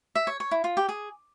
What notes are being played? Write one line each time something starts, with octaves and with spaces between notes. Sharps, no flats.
E5
C#5
C#5
E4
F4
G4
G#4